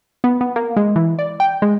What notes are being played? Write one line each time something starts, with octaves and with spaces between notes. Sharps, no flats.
B3
B3
A#3
G#3
E3
D5
G5
G#3